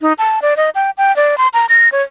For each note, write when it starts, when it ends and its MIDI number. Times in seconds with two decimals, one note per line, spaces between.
0.01 0.13 63
0.18 0.42 81
0.42 0.57 74
0.57 0.70 75
0.75 0.91 79
0.98 1.14 79
1.16 1.38 74
1.38 1.48 84
1.54 1.66 82
1.69 1.89 94
1.92 2.03 73